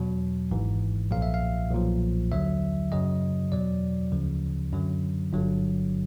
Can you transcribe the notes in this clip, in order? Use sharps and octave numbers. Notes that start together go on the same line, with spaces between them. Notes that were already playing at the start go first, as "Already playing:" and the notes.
Already playing: E2 B2 F#3
G#1 G#2 E3
B1 A#2 F3 F5
E5
F5
B1 A#2 F3
D#2 D3 F#3 E5
F#2 C#3 F#3 D#5
E2 B2 F#3 D5
D2 C#3 F3
F#2 D3 F#3
G1 G2 D3 F#3